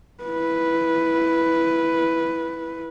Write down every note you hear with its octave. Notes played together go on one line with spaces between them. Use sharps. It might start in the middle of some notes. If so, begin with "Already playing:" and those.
E4 B4